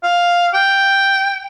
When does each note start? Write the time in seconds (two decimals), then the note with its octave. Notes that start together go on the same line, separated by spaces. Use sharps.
0.03 F5
0.54 G5